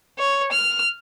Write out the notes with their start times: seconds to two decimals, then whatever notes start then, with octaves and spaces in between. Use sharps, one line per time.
0.19 C#5
0.52 F6